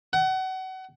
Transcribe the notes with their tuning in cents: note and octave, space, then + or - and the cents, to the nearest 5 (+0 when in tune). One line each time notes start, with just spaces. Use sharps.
F#5 +30